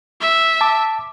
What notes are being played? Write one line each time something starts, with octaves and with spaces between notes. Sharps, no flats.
E5
A5 D6